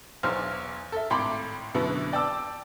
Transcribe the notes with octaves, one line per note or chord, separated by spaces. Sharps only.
B1 E2 C5 C6 F6
A4 E5
G#1 A2 G5 B5 C6 D6
F#2 B2 D3 B3 E4
D5 G5 A5 D6 E6